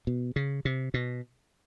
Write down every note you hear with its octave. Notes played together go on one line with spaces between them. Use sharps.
B2
C#3
C3
B2